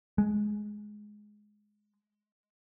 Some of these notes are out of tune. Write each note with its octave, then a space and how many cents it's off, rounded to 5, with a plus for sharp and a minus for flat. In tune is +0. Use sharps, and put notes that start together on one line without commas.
G#3 +10